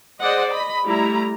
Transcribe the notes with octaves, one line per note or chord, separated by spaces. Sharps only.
G#4 C5 D5 D#5 F#5
D#5 B5
G3 A3 E4 A#5